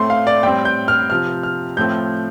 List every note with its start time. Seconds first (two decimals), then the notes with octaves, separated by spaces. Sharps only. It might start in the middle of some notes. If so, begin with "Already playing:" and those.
Already playing: A2 A3 C4 C6
0.10 F5
0.27 D5
0.43 A2 G3 C4 G5
0.65 G6
0.88 F6
1.10 C3 F3 C4 F6
1.43 F6
1.77 A2 F3 A3 C4 G6